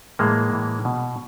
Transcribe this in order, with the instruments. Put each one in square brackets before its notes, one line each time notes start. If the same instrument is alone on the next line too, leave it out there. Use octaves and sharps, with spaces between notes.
[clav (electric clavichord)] A2 E3 G#3 A#3
A2 E3
B2